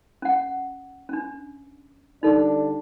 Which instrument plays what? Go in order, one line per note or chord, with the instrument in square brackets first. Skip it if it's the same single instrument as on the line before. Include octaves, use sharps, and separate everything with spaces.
[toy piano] C#4 F#5
C#4 D4
[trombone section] D3 G3 D4 [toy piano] D#4 A4